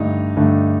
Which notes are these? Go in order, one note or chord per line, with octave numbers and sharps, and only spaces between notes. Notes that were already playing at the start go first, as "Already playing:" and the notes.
Already playing: G2 D3 A3 D#4
G2 D3 A3